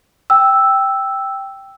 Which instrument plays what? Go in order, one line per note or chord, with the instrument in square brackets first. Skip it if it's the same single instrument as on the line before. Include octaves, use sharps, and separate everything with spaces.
[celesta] G5 E6